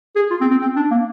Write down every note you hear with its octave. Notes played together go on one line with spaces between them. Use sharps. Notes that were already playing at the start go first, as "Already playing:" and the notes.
G#4
F4
C4
C4
C4
D4
A#3